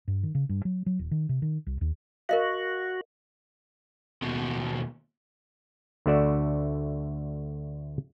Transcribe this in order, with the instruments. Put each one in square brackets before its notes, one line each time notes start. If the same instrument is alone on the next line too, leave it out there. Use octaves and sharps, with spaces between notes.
[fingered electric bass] G2
D#3
C#3
G2
F#3
F#3
D#1
D#3
C3
D#3
C2
D#2
[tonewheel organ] F#4 [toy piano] A#4 D#5 F5
[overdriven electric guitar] D#2 B2
[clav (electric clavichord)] D2 D3 A3 F#4 D5 E5